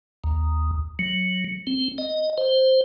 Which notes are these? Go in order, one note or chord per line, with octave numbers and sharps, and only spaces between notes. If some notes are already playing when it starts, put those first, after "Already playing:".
D#2
F#3
C4
D#5
C5